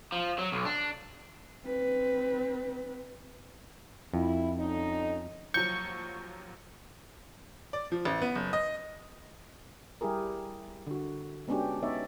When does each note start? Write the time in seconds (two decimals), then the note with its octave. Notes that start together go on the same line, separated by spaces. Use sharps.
0.12 F3
0.39 F#3
0.52 B1
0.65 D4
1.65 C4 B4
4.14 F2 E4
4.58 D3 C#4 D#4
5.54 D#2 F3 F#3 C#6 G6
7.73 D5
7.92 F3
8.05 A1
8.22 B3
8.35 F#1
8.53 D#5
10.01 G3 E4 G4 G#4 A#4
10.87 D3 F#4
11.48 G#3 B3 C#4 D4 F#4 G4
11.83 B3 D#4 C#5 D5 E5